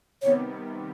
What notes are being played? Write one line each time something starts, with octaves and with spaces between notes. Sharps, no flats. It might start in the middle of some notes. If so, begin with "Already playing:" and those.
C3 D#3 G3 B3 C#5